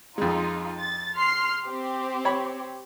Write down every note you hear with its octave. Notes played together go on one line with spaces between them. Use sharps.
F2 G#3 D#4 F4
A6
C6 F6 C7
C4 G4
C#5 B5